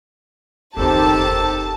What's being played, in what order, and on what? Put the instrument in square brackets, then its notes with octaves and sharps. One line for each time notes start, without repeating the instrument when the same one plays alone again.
[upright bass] F#1 E2 [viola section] D#3 C4 G4 [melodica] A4 [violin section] A5